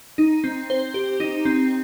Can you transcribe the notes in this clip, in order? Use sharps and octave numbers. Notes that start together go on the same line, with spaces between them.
D#4
C4
C5
G4
D#4
C4